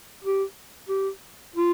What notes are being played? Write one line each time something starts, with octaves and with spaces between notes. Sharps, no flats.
G4
G4
F4